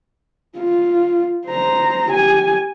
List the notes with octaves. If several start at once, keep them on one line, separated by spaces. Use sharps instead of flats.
F4
C5 A#5
G4 G#5